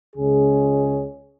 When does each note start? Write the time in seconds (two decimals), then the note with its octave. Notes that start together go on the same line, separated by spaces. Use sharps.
0.15 C#2 C#3 G#3 C#4 G#4